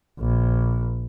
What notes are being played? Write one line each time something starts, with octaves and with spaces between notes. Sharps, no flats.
A#1